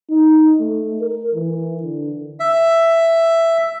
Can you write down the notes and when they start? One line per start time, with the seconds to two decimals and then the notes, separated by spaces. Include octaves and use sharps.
0.10 D#4
0.60 A3
1.01 A#4
1.35 E3
1.82 D3
2.40 E5